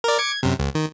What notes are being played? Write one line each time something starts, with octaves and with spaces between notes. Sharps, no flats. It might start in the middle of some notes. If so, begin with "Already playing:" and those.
A#4 D5
D6 G#6 C#7
G#6
F#2 C3
C#2
D#3